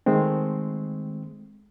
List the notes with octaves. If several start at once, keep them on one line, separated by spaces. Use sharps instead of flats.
D#3 G#3 A3 C4